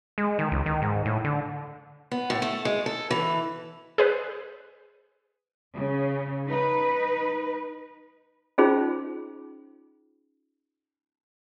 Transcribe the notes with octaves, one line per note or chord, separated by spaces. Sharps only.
G#3
D#3
C#2
D#3
G#2
A2
D3
B3
A2
A3
G#3
A4
E3
G#4 B4 C5
C#3
D#4 B4
C#4 D#4 F4 G#4 C5 B5